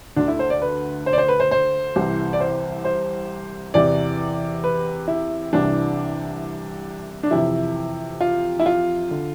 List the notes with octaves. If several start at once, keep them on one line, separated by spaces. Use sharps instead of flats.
D2 D3 D4
E4
C5
D5
B4
C5
D5
C5
B4
C5
C5
C2 C3 E3
D5
C5
C5
E2 C3 E3 D5
B4
E4
C2 C3 E3 D4
D4
F2 C3 E3 E4
F4
E4
F4
D3